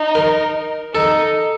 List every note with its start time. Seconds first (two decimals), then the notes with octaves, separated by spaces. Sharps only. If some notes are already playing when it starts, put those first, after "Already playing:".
Already playing: D#4
0.15 A#4
0.94 D#4 A4